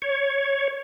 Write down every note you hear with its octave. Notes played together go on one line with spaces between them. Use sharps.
C#5